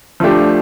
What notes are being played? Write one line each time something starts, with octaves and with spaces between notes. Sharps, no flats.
F3 A3 D4 G4